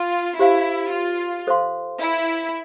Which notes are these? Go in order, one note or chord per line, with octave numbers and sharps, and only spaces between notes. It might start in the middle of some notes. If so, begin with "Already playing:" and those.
Already playing: F4
E4 G4 C5 F5
F4
A4 C5 F5 C6
E4